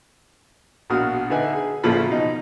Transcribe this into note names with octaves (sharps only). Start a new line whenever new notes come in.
A#1 B2 F#4 D#6 F6
D3 D#4 B4 E5 G#5
G#4
A1 A#2 C#3 F3 A4 B5
B2 D#4